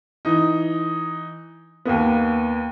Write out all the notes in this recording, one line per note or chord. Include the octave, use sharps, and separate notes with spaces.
E3 D#4
D#2 A#3 B3